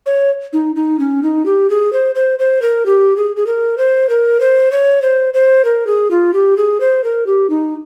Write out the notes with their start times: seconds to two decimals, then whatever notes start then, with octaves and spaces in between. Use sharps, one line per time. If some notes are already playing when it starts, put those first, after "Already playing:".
0.06 C#5
0.53 D#4
0.76 D#4
0.99 C#4
1.23 D#4
1.46 G4
1.70 G#4
1.93 C5
2.15 C5
2.39 C5
2.62 A#4
2.86 G4
3.17 G#4
3.36 G#4
3.47 A#4
3.78 C5
4.09 A#4
4.40 C5
4.72 C#5
5.02 C5
5.34 C5
5.65 A#4
5.87 G#4
6.11 F4
6.34 G4
6.57 G#4
6.80 C5
7.04 A#4
7.27 G4
7.50 D#4